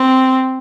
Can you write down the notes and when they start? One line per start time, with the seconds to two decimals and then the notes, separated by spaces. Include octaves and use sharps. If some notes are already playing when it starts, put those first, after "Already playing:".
Already playing: C4